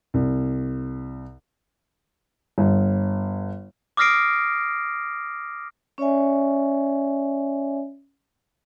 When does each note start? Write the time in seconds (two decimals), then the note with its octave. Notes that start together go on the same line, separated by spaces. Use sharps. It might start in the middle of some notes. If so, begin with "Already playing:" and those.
0.14 C2
2.58 G1
3.97 D6 D#6 F6 A#6 C7 D7
5.98 C#4 C#5 D5 E5 G#5